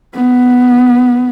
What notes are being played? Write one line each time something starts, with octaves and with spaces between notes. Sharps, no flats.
B3